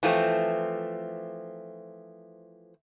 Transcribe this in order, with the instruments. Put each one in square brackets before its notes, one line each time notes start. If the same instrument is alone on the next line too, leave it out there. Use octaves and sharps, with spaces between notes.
[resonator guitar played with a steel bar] E3 F3 A3 C4